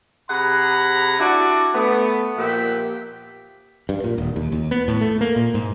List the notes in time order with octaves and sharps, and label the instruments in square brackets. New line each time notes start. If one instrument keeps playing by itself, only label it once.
[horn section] C3 G#4 F#5 A#5 B5
D4 E4 F#4 D5
A3 B3
A#2 F3 G4 E5 F#5
[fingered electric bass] G2
A#2
D#1
D#2
D#2
B3
A2
A3
A#3
A#2
G#2